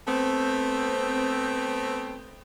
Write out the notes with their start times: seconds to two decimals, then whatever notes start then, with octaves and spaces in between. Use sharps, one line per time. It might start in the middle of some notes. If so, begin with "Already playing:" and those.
0.08 A3 B3 C4